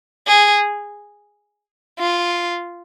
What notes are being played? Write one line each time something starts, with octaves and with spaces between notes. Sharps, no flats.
G#4
F4